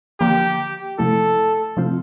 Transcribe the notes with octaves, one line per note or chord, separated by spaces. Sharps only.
D3 F3 A#3 G4
C3 F3 A3 E4 A4
C3 F3 A3 C4 F4